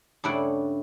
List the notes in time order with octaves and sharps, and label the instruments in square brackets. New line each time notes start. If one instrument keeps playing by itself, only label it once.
[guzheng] G2 C#3 A3 E4 D5 F#5